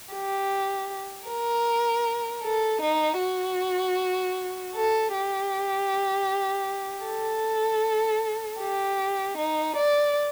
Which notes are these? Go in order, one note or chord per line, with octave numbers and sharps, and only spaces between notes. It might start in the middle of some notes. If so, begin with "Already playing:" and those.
G4
A#4
A4
D#4
F#4
A4
G4
A4
G4
D#4
D5